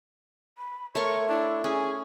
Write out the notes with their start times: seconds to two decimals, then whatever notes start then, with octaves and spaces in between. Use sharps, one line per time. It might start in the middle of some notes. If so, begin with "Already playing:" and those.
0.58 B5
0.95 A3 A#4 C#5 C6 C#6
1.29 D4 E4
1.64 C#4 G#4